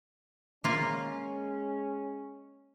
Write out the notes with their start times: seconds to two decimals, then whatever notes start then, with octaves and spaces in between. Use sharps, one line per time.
0.64 G#3 A#3 C#4 F4